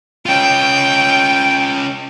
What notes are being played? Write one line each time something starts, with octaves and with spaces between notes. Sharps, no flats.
C#4 F4 G5